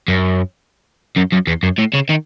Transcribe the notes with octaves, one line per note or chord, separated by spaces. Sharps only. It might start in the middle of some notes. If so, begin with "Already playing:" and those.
F#2
F#2
F#2
E2
F#2
A2
C#3
D#3